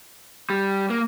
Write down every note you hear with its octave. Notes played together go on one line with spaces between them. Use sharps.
G3
A#3